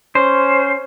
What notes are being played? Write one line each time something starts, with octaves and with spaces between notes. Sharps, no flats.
C#4 C5